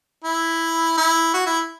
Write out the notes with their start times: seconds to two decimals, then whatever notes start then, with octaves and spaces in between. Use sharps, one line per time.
0.24 E4
0.97 E4
1.34 F#4
1.46 E4